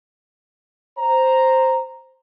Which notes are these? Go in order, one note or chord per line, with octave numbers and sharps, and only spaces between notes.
C5 A#5